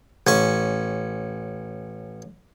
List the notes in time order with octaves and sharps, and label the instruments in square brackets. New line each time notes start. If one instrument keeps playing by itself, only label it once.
[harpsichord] A1 C#4 C#6